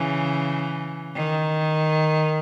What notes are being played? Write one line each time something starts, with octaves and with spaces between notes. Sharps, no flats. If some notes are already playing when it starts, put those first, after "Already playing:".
Already playing: C#3 E3
D#3